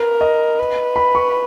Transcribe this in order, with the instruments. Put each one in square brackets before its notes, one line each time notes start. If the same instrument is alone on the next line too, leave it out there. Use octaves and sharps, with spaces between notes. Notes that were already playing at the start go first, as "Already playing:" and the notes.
Already playing: [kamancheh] A#4 [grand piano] B4
[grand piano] D#5
[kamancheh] B4
[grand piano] B5
C#6